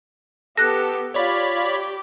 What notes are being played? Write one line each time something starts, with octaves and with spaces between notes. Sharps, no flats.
B3 G4 A4 F#6 A#6
F4 G4 C#5 D5 B5
G4